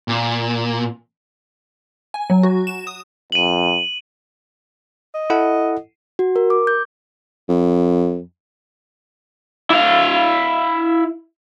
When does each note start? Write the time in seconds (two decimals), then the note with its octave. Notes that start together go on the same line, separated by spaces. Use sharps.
0.08 A#2
2.14 G#5
2.30 F#3
2.43 F#4
2.67 E7
2.87 D#6
3.32 F2 D#7 F#7
5.14 D#5
5.30 E4 A4 F#5
6.19 F#4
6.36 A#4
6.50 D6
6.67 G6
7.49 F2
9.70 E4 F5